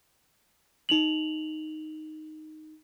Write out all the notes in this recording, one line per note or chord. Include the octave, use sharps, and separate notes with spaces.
D#4 F7 F#7